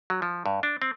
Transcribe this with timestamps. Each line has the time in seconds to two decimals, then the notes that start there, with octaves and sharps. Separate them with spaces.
0.10 F#3
0.22 F3
0.46 G2
0.63 D4
0.82 C4